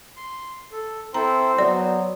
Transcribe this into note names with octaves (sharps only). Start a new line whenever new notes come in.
C6
A4
C4 E4 A4 C5 A#5
F#3 B3 D5